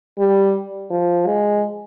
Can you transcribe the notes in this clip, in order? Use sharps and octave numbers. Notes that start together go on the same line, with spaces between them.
G3
F3
G#3